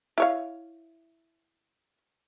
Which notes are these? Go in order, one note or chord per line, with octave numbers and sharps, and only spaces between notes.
E4 C#5 F5